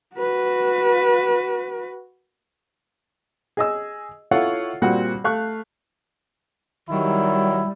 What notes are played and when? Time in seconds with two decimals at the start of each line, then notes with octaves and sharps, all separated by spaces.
0.16 F#4 B4
3.57 G#4 D#5 E6
4.31 E4 F4 A4 C#5 F5 F#5
4.82 A#2 G3 C4 F#4 F#5
5.24 A3 F5 C#6 F#6
6.90 D#3 F#3 G3 E4